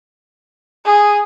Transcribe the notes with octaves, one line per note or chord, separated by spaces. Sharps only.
G#4